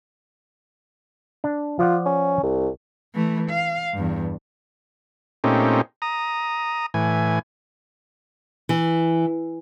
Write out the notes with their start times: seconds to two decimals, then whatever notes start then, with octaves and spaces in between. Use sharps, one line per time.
1.44 D4
1.79 F3 F4 D5 F#5
2.06 C#4
2.43 C2
3.14 E3 A3
3.50 F5
3.93 E2 G2
5.44 A#2 A3 C4 C#4 D#4 G4
6.02 A#5 D#6
6.94 A2 E3 G#5
8.69 E3